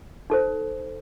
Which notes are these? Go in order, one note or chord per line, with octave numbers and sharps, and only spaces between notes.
D#4 A4 C5